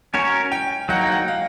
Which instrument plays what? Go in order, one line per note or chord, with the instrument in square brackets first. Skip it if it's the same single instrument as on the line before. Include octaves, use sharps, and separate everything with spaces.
[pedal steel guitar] C#4 F#4 A#4 C#5 [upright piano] G#5
[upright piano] G5
[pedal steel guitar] F#3 A#3 D#4 [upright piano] F#5
[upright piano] G5
F#5
F5